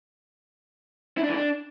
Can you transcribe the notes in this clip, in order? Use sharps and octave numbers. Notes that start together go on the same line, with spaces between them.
E4
D4
E3
D4